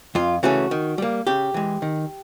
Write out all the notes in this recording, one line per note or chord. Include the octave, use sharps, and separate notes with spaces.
F2 F4
C#3 E3 A3 C#4 F#4
D#3
G3 A#3
C#3 G4
E3 G#3
D#3